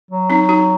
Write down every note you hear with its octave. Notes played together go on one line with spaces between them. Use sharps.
F#3
C4 D#4
D#4 F#4